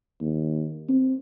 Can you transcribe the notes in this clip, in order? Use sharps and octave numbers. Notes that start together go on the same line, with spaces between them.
D#2
C4